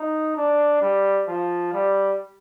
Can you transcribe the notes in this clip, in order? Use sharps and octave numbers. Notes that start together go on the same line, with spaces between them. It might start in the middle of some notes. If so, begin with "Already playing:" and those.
Already playing: D#4
D4
G3
F3
G3